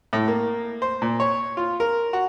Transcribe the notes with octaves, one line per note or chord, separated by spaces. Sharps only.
A2
A#3
C5
A#2
C#5
F4
A#4
F#4